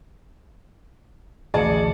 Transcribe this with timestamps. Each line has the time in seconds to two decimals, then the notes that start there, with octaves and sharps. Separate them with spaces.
1.54 A1 D2 G#4 D5 A5 C#7